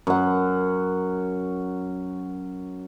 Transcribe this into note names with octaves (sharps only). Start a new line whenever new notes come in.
F#2 F#5